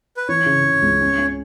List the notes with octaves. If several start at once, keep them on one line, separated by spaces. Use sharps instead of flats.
B4
E3 C#5
C#3
C#3
C#2
C#4
C#4